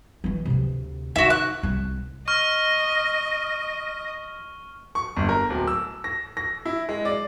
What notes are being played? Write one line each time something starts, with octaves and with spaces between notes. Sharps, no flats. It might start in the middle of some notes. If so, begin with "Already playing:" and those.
E3 G#3
D2 C3
D#4 F#4 E5
F#6
C2
D#5 C#6 F6
C#6
G1
A#4
D1
E6
A#6
A#6
E4
G#3
D5